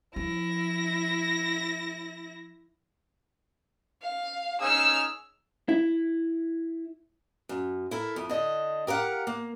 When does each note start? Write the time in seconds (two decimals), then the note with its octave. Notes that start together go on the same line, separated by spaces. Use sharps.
0.16 F3 E4 A#6
4.02 F5
4.61 C#4 D#4 G#4 E6 F6
5.69 E4
7.49 F#2
7.91 E4 A4 A#4
8.16 F2
8.29 D3 D#5
8.87 G4 A#4 F5 F#5
9.27 A#3